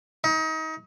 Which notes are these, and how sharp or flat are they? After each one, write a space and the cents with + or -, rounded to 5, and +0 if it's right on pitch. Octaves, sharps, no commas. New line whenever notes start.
D#4 +30